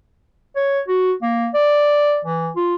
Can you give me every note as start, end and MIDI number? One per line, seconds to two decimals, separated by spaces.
0.56 0.80 73
0.88 1.12 66
1.22 1.49 58
1.54 2.20 74
2.25 2.50 52
2.56 2.76 65